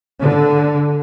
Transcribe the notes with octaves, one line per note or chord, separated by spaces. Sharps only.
D3